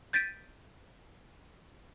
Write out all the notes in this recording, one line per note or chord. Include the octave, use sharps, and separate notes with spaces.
G6 A6 B6 D7 D#7